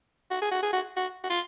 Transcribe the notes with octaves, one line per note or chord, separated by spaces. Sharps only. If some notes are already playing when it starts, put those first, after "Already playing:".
F#4
G#4
F#4
G#4
F#4
F#4
F#4
F4